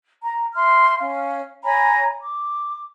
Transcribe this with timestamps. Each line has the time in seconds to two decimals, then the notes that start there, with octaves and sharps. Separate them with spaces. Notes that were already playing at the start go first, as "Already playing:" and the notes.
0.22 A#5
0.54 E5 C6 F6
0.98 C#4 F5
1.64 C#5 G#5 A#5 B5
2.22 D6